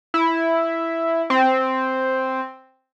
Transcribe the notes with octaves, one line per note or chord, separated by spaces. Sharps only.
E4
C4